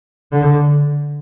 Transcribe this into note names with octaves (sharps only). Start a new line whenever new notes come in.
D3